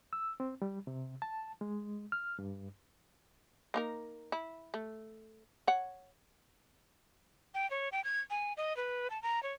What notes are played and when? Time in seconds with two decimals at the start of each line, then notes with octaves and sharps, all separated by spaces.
0.13 E6
0.40 C4
0.62 G3
0.87 C3
1.22 A5
1.61 G#3
2.12 F6
2.39 G2
3.74 A#3 D#4 A#4
4.32 E4
4.74 A3
5.67 C#5 F#5
7.54 G5
7.71 C#5
7.92 G5
8.04 G#6
8.30 G#5
8.57 D#5
8.77 B4
9.10 A5
9.23 A#5
9.43 C#5